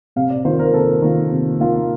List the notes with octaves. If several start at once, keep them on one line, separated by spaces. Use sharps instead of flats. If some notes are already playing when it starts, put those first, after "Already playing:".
C3 F5
D5
D#3 A#3 F4 C5
A#4
C3 A4
D#3 A#3 F4
C3
D#3 A#3 F4